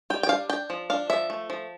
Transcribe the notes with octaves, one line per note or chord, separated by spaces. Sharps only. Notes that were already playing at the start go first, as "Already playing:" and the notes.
G3 G5
G5
D4 F5
D4 G5
F3
D4 F5
F3 E5
A3
F3